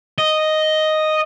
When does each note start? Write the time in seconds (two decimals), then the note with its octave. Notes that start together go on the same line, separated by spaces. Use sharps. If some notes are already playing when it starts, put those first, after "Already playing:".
0.18 D#5